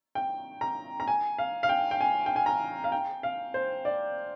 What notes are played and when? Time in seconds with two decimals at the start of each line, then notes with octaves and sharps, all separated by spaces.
0.15 G5
0.61 A#5
1.00 A#5
1.08 G#5
1.38 F5
1.63 F5
1.69 G5
1.91 G5
2.01 G#5
2.26 G5
2.36 G#5
2.46 A#5
2.84 F5
2.92 G5
3.23 F5
3.54 C5
3.85 D5